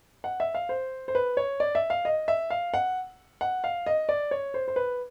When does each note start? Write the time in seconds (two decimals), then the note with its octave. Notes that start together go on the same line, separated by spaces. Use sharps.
0.24 F#5
0.40 E5
0.55 F5
0.69 C5
1.08 C5
1.15 B4
1.37 C#5
1.60 D5
1.75 E5
1.90 F5
2.05 D#5
2.28 E5
2.50 F5
2.74 F#5
3.41 F#5
3.64 F5
3.86 D#5
4.09 D5
4.31 C#5
4.54 C5
4.68 C5
4.76 B4